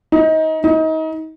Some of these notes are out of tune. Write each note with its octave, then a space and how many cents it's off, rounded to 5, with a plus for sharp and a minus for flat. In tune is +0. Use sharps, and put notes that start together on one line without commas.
D#4 +25
D#4 +30